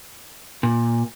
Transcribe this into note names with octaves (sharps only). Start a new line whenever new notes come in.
A#2